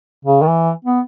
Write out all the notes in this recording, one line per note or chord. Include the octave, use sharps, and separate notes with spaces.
C#3
D#3
E3
B3